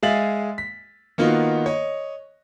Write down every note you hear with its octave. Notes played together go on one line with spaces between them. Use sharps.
G#3 G#4 E5 F5 A6 F#7
B6
D#3 A#3 B3 D#4 F4 F#4
C#5 D#5